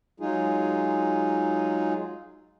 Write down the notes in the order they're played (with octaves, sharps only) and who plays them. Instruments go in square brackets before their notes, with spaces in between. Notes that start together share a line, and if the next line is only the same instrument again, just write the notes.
[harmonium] F#3 G#3 D#4 F4 G#4